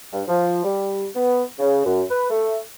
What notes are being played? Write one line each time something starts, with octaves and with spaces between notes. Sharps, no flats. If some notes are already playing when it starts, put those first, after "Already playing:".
G2
F3
G3
B3
C#3
F#2
B4
A3